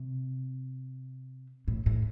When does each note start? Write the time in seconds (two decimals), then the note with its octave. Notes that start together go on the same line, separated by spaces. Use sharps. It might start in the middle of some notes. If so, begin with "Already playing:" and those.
Already playing: C3
1.68 A2
1.86 A2